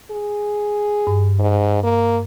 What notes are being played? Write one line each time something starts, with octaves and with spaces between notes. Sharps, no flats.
G#4
G2
G#2
A#3